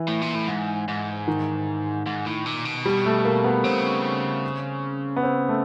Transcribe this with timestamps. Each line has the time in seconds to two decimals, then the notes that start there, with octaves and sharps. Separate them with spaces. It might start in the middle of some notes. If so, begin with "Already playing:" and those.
Already playing: E3
0.08 A2
0.22 A#2
0.35 A2
0.48 G#2
0.88 G#2
1.28 D#3
2.06 G#2
2.26 A2
2.46 A#2
2.65 B2
2.85 G3
3.06 A3
3.25 A#3
3.44 B3
3.64 C#3 C4
5.16 B3
5.23 C4
5.49 A3